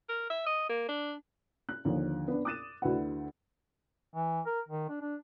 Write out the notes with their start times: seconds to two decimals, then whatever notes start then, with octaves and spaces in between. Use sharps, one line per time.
0.09 A#4
0.30 E5
0.46 D#5
0.69 A#3
0.89 D4
1.69 F#6
1.85 D#2 D3 F3
2.28 B3 D4
2.45 D6 D#6 F#6 A6 D#7 E7
2.82 D2 D3 E4 F#4 B4 F#5
4.14 E3
4.46 A#4
4.68 D#3
4.89 D4
5.01 D4